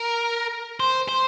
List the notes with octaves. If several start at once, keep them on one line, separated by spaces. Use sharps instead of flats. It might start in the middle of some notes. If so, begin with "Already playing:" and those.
Already playing: A#4
C5
C5